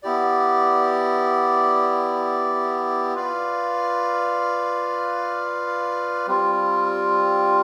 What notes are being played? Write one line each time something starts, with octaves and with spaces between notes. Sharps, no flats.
B3 E4 G4 D5
F4 B4 D5 F5
G3 C4 F4